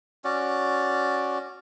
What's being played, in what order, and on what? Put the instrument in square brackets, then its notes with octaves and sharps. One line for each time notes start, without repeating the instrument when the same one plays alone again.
[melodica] C#4 F#4 D5